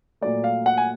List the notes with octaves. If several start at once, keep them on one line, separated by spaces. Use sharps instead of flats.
A#2 F#3 A3 D5
F5
F#5
G#5